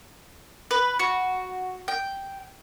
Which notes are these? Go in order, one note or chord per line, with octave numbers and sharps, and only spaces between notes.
B4
F#4
G5